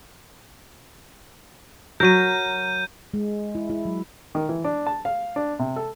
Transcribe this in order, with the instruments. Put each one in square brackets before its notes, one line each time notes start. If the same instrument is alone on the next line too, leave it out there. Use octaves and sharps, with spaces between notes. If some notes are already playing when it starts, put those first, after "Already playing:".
[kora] F#3 A#4 [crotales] G6 D#7
[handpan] G#3
E4
E4
F#3
[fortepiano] D#3
E3
D4
A5
F5
D4
C3
A4